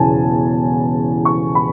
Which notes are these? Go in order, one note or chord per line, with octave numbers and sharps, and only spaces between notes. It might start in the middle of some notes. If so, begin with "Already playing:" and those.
Already playing: E1 E2 C#3 G#5 A5
C#6
B5